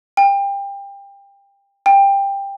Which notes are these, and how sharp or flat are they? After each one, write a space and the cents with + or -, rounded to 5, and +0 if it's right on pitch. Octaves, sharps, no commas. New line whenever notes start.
G5 +25
G5 +15